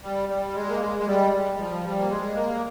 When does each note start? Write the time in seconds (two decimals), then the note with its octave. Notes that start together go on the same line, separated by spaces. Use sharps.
0.03 G3
0.29 G3
0.55 G#3
0.68 A#3
0.80 G#3
0.98 G#3
1.06 G3
1.32 G3
1.58 F3
1.84 G3
1.98 A#3
2.09 G#3
2.35 A#3